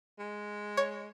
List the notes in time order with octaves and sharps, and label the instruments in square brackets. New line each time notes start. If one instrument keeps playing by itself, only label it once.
[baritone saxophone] G#3
[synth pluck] C#5